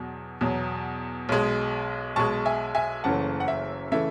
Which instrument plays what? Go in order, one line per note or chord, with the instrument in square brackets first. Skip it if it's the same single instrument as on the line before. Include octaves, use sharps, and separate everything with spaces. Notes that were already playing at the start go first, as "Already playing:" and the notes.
Already playing: [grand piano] E2 B2 F#3
E2 B2 F#3
B1 B2 G#3
B1 B2 G#3 A5 C#6
E5 G#5
E5 G#5
F#1 F#2 C#3 E3 A3 F#5 A5
F#5
E5
C#3 E3 A3 E5